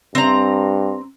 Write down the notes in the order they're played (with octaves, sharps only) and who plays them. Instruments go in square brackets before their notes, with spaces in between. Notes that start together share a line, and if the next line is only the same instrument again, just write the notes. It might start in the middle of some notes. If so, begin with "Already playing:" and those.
[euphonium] G2 [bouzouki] C4 A#5